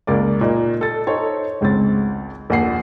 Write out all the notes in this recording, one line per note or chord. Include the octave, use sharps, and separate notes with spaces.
C#2 A#3 D5
A#2 D#4
A4 A6
D#4 A4 C5 C#5
G#1 C#2 C4 A6
A#1 D#2 F#5 C7